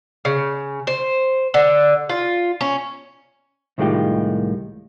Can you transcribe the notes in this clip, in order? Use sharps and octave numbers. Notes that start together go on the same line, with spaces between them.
C#3
C5
D3
F4
C#4
C2 A2 D#3 G#3 F4 G4